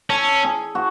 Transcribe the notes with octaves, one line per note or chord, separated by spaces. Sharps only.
C#4 A4
G#4
F#4